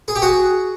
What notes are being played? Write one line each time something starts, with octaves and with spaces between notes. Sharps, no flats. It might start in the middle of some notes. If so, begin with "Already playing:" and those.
G#4
G4
F#4 G#4